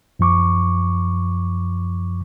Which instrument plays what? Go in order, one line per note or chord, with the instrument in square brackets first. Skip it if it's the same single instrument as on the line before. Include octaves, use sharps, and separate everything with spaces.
[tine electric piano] F#2 F3 C#6 D6